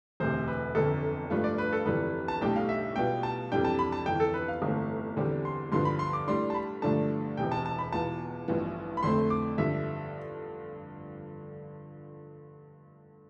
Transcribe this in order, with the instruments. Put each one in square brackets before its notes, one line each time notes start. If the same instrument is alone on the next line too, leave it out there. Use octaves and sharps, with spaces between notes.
[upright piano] E1 D2 C3 [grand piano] C5
[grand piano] B4
[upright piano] G1 F2 D3 [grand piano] A4
[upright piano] G2 F3 A3 D4 F4 [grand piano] B4
[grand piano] D5
B4
A4
[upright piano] G1 F2 E3 G3 [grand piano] B4
[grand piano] A5
[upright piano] B1 A2 G3 D4 G4 [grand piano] G5
[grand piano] F5
E5
[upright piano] B2 G3 B3 F4 [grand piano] G5
[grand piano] A5
[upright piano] F2 C3 E3 G3 D4 [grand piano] G5
[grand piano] A5
B5
A5
[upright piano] G1 F2 E3 [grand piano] G5
[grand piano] A4
B4
F5
[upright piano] G1 G2 E3 A3 C4
E2 D3 G3 C4 G4
[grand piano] C6
[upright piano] G2 D3 F3 B3 [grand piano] C6
[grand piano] B5
C6
D6
[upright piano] A2 G3 D4 [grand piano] C6
[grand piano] A5
B5
[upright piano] G2 D3 F3 A3 D4 [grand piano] A5
[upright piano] E1 E2 C3 [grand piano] G5
[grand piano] A5
A5
B5
[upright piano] E2 B2 B3 F4 [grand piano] A5
[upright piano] A1 G2 F3 B3
[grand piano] B5
[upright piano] F2 D3 A3 C4 [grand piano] C6
[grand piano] D6
[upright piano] G2 D3 F3 [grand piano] E5